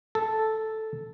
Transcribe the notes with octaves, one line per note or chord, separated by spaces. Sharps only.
A4